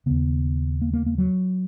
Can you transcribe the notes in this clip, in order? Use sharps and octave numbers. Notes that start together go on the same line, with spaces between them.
D#2 C#3 B3
A#3
A#3
A#3
F#3